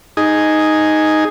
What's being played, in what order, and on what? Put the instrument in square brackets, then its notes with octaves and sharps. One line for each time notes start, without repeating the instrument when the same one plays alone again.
[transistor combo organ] D#4 G#4